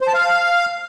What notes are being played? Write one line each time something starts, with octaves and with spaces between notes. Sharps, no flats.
C5
A5
F5